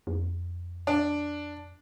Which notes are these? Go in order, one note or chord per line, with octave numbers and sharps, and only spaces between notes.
F2
D4